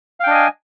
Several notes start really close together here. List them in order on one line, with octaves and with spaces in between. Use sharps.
F5 G5 D4 D#5 G#5